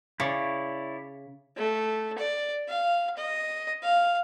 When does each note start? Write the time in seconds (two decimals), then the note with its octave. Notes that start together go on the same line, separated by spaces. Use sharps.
0.20 C#3 E4 C#5 D5
1.57 A3
2.18 D5
2.69 F5
3.17 D#5
3.83 F5